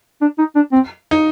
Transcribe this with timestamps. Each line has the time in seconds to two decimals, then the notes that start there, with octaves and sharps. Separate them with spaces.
0.21 D4
0.38 D#4
0.56 D4
0.72 C4
1.11 D#4